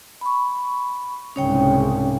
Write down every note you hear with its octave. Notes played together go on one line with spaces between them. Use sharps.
B5 C#6
C2 G#2 C#3 C#4 C#5 G5